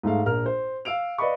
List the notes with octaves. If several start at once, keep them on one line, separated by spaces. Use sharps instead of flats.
G#2 A3 F5
A#1 A#4 F6
C5
F5 E6 D7 F7
B4 D5 D#5 F5 B5 C#6